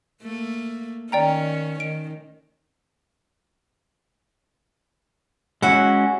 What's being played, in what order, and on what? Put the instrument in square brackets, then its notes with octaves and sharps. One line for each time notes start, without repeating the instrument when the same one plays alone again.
[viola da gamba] A3 A#3
[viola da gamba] D#3 C#4 [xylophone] D5 G5 A#5
[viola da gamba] D#3 [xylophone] D7
[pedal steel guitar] G#3 C#4 F#4 [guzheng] E4 F#5